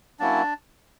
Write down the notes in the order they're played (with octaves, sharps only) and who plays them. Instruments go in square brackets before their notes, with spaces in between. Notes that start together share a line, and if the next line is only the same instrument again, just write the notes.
[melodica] F#3 A#3 C#4 D4 E4 D5